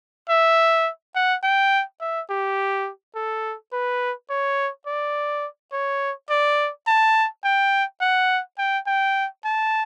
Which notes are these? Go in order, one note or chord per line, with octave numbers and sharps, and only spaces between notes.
E5
F#5
G5
E5
G4
A4
B4
C#5
D5
C#5
D5
A5
G5
F#5
G5
G5
A5